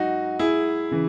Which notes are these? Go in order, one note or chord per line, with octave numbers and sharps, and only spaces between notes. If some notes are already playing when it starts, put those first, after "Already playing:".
Already playing: G#2 F#3 D#4 F#4
E4 G#4
C#3 E3